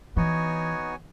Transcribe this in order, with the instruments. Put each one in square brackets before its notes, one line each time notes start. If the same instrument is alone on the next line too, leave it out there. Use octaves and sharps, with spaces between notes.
[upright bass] E3 [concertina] B3 D#4 F#4 C#5 G#5